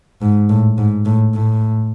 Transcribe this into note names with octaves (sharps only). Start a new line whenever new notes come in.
G#2
A2
G#2
A2
A2